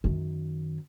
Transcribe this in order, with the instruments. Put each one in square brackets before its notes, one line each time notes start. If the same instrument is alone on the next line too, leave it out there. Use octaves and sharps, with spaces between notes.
[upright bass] F#2 D#3